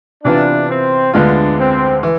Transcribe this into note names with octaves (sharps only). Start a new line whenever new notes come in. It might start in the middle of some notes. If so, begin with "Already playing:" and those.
C3 E3 B3 D4 F4
C4
D2 D3 G#3 B3 D4 F4
C4
E3